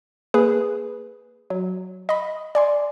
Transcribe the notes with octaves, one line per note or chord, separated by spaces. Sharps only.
A#3 G#4 B4
F#3
D#5 B5
D5 G#5 C6